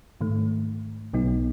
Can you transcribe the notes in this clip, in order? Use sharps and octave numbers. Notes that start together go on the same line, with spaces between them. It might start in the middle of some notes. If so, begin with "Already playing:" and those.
G#2 D#3 A3
B1 B2 F#3 B3 D#4